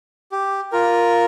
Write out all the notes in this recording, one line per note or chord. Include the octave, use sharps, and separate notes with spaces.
G4
F4 A#4